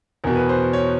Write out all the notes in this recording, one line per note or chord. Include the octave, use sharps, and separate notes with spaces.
E2 B2 A#4
B4
C5
C#5